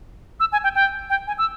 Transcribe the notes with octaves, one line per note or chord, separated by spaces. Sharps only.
E6
G#5
G5
G5
G5
G#5
E6